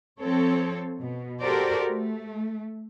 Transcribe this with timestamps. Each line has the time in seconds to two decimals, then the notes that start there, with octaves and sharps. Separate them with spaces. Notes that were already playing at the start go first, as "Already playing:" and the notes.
0.19 F3 C4 A4 C#5
1.00 B2
1.41 F#4 G4 A4 A#4 C5 D5
1.88 A3